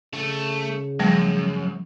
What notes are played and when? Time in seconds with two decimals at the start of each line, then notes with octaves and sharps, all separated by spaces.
0.13 C#3 A3
1.00 F#2 F3 G3 A3